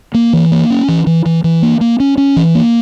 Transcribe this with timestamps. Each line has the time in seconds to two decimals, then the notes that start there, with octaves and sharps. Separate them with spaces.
0.14 A#3
0.33 E3
0.52 A#3
0.70 C#4
0.88 E3
1.07 E3
1.26 E3
1.44 E3
1.62 A#3
1.81 A#3
2.00 C#4
2.18 C#4
2.36 E3
2.55 A#3